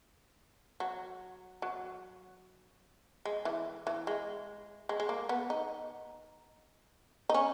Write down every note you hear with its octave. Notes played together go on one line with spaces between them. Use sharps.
F#3
F#3
G#3
E3
E3
G#3
G#3
G#3
A#3
B3
D#4
D#4
C#4